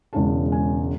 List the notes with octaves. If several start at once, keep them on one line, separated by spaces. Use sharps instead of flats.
E1 E2 C#3 G#3 A5
G#5